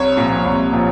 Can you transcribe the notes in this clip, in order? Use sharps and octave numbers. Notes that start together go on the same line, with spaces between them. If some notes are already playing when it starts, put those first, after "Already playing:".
Already playing: C2 C#5
A#2 F3
C2
A#2 F3